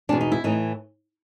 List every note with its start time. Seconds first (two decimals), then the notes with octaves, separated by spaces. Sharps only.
0.09 E2 B2 D4
0.21 D#4
0.32 E4
0.44 A2 E3 D#4